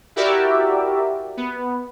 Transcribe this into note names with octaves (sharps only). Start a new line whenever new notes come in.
E4 F#4 G4 A#4 D5 E5
B3